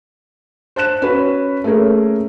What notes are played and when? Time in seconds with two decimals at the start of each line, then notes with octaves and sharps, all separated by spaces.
0.76 C5 A5 F#6 E7
1.02 C#4 F#4 B4 C#5
1.64 A3 A#3 C#4 G#4 A#4